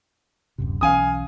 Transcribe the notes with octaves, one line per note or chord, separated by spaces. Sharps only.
D1 F#2 C3
B1 E3 C#4 F5 G#5 D#6